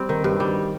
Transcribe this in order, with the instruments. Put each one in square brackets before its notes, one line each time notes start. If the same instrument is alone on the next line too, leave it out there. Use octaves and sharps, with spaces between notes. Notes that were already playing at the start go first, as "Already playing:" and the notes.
Already playing: [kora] G3 C4
D#3
G2
G3